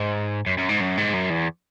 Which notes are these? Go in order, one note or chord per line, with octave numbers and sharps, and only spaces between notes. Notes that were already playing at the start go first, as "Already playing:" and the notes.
Already playing: G#2
F#2
F#2
G#2
F#2
G#2
F#2
E2